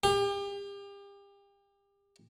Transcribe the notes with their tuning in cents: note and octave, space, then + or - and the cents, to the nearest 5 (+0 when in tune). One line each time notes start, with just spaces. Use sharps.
G4 +35